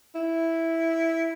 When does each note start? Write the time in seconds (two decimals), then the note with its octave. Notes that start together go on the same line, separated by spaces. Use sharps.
0.15 E4